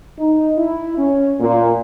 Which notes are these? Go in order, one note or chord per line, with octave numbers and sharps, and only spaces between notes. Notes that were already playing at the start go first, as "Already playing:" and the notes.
D#4
E4
C#4
A#2